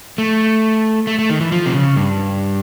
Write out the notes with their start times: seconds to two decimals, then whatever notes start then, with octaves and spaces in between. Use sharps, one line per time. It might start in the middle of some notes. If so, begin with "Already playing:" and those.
0.18 A3
1.07 A3
1.19 A3
1.30 D#3
1.41 E3
1.52 F3
1.66 C3
1.74 C#3
1.97 G2